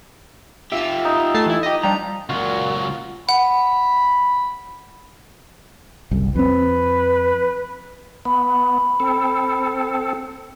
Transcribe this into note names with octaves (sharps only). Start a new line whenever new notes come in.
F4 G4 E5 E6
D#4
A3 A5 C7
E3 E4
G4 D#5
F3 G3 D4 A#5
C#2 A#2 F#3 F4 F#4
F#5 B5
F#1 C2
F2 C4 B4
B3 B5
C4 A4